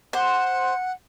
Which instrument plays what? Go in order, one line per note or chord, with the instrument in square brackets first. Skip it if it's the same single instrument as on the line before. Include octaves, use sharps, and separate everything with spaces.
[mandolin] C5 [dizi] F#5